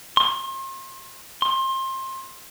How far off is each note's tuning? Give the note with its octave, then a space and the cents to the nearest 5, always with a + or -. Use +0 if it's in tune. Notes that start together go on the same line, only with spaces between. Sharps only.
C6 +40
C6 +25